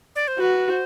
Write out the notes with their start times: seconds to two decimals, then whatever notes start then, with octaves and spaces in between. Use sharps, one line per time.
0.15 D5
0.28 C5
0.40 F#4 B4
0.70 C5